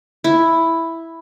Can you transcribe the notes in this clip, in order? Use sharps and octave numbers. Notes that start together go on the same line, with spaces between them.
E4